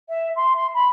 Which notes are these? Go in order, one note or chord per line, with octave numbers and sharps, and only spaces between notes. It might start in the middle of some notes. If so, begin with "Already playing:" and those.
E5
C6
C6
B5